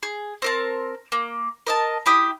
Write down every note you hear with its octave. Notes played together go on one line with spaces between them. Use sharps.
G#4
C4 A#4 A5
A#3
A#4 D#5 A5
E4 G4 D#6